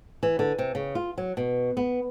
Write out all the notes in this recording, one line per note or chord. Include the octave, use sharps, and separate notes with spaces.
E3
D3
C3
C#3
F4
F#3
B2
B3